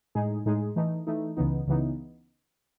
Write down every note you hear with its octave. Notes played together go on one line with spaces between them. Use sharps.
A2 G#3 D#4 G#4
A2 G#3 D#4 G#4
E3 A3 D#4
E3 A3 D#4
C#2 C#3 E3 B3 D#4
C#2 C#3 E3 B3 D#4